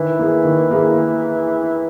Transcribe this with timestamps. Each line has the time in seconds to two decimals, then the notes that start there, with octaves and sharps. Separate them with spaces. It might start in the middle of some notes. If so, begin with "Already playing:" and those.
Already playing: D#3 E3
0.19 A#3 E4 G#4
0.45 D#3
0.71 A#3 E4 G#4